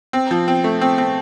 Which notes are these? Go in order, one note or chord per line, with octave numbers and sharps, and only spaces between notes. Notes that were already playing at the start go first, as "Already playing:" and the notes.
C4
F3
C4
A3
C4
C4